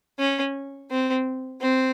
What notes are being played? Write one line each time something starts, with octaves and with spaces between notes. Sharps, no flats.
C#4
C4
C4